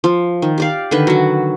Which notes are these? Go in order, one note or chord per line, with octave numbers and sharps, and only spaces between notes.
F3
D#3
G4 D5 F5
D3 D#3 B4
F#3 F#4